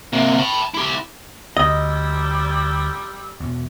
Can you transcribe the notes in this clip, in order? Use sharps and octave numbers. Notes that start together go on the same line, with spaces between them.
C3 A#3
A5 B5
E4 G4
D2 G3 D#5 E6
E2 B2